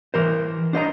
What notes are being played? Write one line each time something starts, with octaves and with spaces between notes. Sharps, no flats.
E3 A#4 C5
D4 C5 D#5 A#5